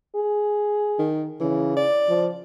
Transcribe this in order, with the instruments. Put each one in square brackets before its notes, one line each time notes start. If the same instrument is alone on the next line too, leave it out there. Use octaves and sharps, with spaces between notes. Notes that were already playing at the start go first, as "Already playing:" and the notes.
[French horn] G#4
[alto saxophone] D#3
[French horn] C#3 [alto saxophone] E3
[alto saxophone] D5
[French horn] F3